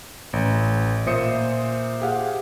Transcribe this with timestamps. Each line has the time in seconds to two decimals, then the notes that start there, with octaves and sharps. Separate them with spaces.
0.33 A1
1.06 A#2 C5 E5 D#6 C#7
2.01 G4 G#4 F5 F#5